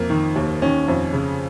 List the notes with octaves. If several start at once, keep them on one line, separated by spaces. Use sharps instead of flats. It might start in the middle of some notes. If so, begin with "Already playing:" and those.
Already playing: F2 A#3
D#3
D#2
D#3 C#4
F2
C#3